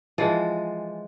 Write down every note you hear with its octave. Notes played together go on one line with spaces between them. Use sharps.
E3 F3 G#3 A4